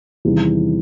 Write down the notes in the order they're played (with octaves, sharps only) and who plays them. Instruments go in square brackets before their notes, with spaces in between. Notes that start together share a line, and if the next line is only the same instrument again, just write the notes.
[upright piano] E2 C3 D#3 G3